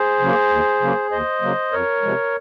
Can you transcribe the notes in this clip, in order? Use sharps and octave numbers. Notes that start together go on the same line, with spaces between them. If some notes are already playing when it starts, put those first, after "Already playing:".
Already playing: G#4 C5
C#3 F#3 A#3
D#2
C#3 F#3 A#3
D#2 C5 D#5
C#3 F#3 A#3
F2 A#4 C#5
C3 F3 G#3